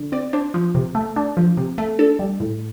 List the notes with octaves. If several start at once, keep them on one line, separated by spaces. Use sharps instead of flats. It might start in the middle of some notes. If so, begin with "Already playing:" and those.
Already playing: D3
C4 D5
D4 C5
F3
C3
A3
D4
F3
C3
A3
D4 A4
G3
A2